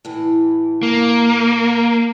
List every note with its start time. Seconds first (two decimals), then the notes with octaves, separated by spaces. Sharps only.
0.05 A2 E3
0.83 A#3